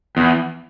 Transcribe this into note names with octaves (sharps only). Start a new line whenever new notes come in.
E2